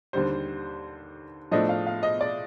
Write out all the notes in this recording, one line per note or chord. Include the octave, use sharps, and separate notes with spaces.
D#2 D3 G3 C5
A2 F3 A3 D4 D#5
F5
F5
D#5
D5